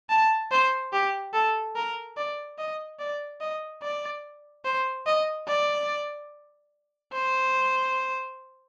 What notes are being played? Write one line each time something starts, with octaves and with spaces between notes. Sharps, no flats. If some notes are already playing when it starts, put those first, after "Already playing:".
A5
C5
G4
A4
A#4
D5
D#5
D5
D#5
D5
C5
D#5
D5
C5